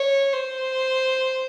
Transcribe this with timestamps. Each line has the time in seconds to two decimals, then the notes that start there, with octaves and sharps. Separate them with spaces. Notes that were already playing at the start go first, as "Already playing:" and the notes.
Already playing: C#5
0.32 C5